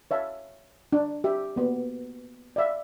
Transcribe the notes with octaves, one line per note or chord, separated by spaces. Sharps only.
C#5 E5 F5 A5
D4
G4 E5
A#3 B3
D5 E5 F5